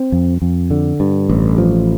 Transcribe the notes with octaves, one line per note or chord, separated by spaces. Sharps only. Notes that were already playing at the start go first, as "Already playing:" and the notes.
Already playing: C4
F2
F2
D3
G2
A1
F3